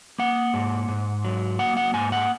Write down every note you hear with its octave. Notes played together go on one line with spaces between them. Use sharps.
A#3 F#5
G#2
G#2
F#3
A#3 F#5
F#5
G#2 G#5
F#5